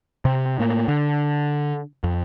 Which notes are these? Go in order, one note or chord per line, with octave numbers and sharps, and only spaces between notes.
C3
A2 A#3
D3
F2